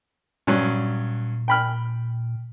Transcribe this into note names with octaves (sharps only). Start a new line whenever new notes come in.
G2 A#2 F#3 C#4
G5 B5 F6